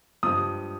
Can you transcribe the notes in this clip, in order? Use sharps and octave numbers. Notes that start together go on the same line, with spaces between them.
G2 F3 D#6